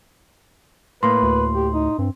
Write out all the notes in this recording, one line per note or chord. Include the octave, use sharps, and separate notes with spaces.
A2 A#3 B4 C6
D2
G4
D#4
G2 C4